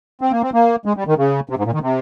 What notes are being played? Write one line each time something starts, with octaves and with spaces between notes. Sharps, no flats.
C4
A#3
C4
A#3
G#3
G3
D#3
C#3
C3
G#2
A#2
D#3
C3